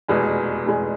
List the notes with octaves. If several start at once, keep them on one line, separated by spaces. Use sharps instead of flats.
F1 E2 B2 G#3
F1 E2 B2 G#3